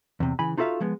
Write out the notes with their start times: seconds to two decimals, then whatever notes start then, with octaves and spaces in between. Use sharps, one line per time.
0.20 E2 C3
0.39 C#3 E3 G#5 B5
0.57 D#4 F4 F#4 A4 E5 F5
0.80 F3 G#3 B3